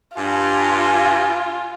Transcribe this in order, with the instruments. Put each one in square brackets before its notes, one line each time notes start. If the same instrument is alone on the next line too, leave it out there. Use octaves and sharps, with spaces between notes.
[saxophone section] G2 [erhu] F4 [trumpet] G#5